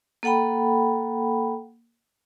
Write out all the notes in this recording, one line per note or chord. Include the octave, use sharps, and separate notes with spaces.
A#3 A4 F#5 G5 B5